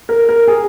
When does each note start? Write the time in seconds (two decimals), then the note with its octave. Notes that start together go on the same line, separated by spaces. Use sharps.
0.09 A#4
0.29 A#4
0.48 G#4